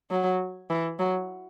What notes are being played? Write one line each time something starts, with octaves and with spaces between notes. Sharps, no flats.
F#3
E3
F#3